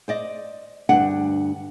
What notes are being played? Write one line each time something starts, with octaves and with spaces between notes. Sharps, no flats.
C5 D5 D#5
D2 G2 D4 F#5